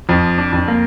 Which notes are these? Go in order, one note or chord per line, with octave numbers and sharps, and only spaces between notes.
F2 F3
D4
F2
A#3